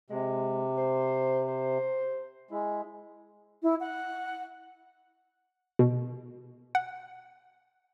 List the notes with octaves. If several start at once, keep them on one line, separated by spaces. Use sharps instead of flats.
C3 G#3
C5
C5
G#3 E4
E4
F#5
B2
F#5